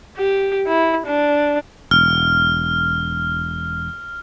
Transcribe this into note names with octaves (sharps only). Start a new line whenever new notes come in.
G4
E4
D4
E1 F6